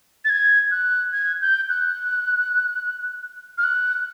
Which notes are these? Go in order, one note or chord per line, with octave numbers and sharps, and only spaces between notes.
A6
G#6
F#6
G#6
G6
F#6
F6
F#6